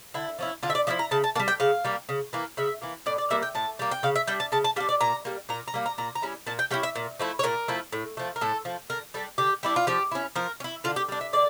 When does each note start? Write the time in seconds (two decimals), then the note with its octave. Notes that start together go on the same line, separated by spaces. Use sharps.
0.14 D3 E4
0.39 F3 C#4 E4
0.63 D3 F4
0.70 E5
0.75 D5
0.87 F3 C#4 E4 E5
0.99 A#5
1.11 C#3 A5
1.24 A5
1.36 A#3 A5
1.39 G3
1.48 G5
1.60 C#3 F5
1.85 G3 A#3
2.09 C#3
2.33 E3 A#3
2.57 C#3 E5
2.82 E3 A#3
3.06 A2 D5
3.18 D5
3.30 G3 A#3 E5
3.43 G5
3.55 A2 A5
3.79 G3 A#3
3.91 G5
4.03 C#3 F5
4.16 E5
4.27 G3 D4 G5
4.40 A5
4.52 C#3 A5
4.64 A5
4.76 G3 F5
4.80 D4
4.89 D5
5.01 A#2 A#5
5.25 G3 A#3
5.49 A#2 A#5
5.68 A#5
5.74 G3 A#3
5.86 A#5
5.98 A#2 A#5
6.15 A#5
6.22 G3 C#4 E4
6.47 A#2 A5
6.59 G5
6.71 G3 C#4 E4 G5
6.83 E5
6.96 A#2
7.20 F3 A3 E4
7.39 C#5
7.43 A#2 A#4
7.68 F3 A3 E4
7.93 A2
8.17 F3 A3
8.36 A#4
8.41 A2 A4
8.65 F3 A3
8.90 D3 A#4
9.14 G3 D4 A4
9.38 D3 G4
9.63 G3 D4 E4
9.76 F4
9.87 F3 G4
10.11 C#4 E4
10.36 F3 A#4
10.60 C#4
10.64 E4
10.84 D3 F4
10.96 G4
11.08 G3 D4
11.21 E5
11.33 D3 D5